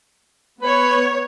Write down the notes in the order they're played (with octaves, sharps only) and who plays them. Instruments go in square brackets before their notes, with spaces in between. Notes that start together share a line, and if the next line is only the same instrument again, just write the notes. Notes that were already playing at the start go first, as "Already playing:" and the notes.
[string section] B3 C#5 [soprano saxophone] B4